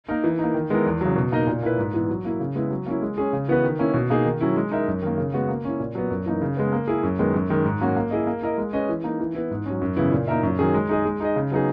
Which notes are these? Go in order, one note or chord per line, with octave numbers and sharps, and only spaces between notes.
A#3 D#4 A#4
E3
A#3 D#4
D#3
G#3 B3 E4 A#4
E2
C#3 F#3
B2
A#3 D#4 A#4 D#5
A#2
A#3 E4 B4
G#2
E3 B3 E4
F#3
A#3 E4
C#3
G#3 B3 E4
F#3
A#3 C#4 E4
G#3
C#4 G#4
C#3
E3 B3 F#4 B4
D#3
A#3 C#4 E4
B2
A#3 D#4 G#4
D#3
F#3 C#4 E4
G#3
D#4 A#4 E5
F#2
D#3 A#3
C#3
G#3 B3 F#4
A#3
C#4 E4
A#2
F#3 B3
F#2
E3 A#3 D#4
C#3
G#3 B3
A#3
E4 G#4
F#2
D#3 G#3 B3
F#2
D#3 G#3
G#2
F#3 A#3 C#4 F#4
A#3
E4 G#4 D#5
A#3
E4 A#4 D#5
G#3
C#4 G#4 B4 D#5
E3
A#3 D#4
E3
B3 E4
G#2
F#3 C#4
F#2
C#3 E3 B3 E4
A#2
A#3 D#4 A#4 E5
F#2
D#3 F#3 C#4 G#4
G#3
D#4 G#4 D#5
G#3
D#4 G#4 D#5
C#3
F#3 B3 D#4 G#4